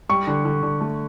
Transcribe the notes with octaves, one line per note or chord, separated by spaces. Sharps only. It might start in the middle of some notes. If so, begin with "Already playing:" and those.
G3 C#6
D3
D3
D3
A3